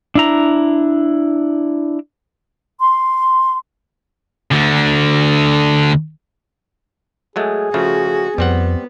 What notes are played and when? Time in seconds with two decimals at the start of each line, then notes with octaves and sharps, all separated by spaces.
0.15 D4 E4 A#5
2.79 C6
4.51 D2 D3
7.36 F#3 G#3 A3 G#4
7.74 C#3 F3 A3 F#4
8.38 F2 G3 B3 C4 F#5